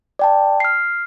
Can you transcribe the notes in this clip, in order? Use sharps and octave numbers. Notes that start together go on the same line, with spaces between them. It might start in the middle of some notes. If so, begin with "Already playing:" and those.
D5 G5 A5
F6 C7